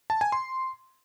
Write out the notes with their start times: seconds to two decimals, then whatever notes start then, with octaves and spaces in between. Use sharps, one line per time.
0.10 A5
0.21 G#5
0.32 C6